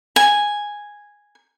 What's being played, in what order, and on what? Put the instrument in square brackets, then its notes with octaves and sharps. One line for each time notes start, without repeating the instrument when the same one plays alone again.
[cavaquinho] G#5